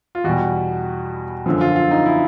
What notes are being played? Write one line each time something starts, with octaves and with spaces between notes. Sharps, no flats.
F4
E2 B2 G3 F#4
F#2 D3 F3
F4
F4
D#4
E4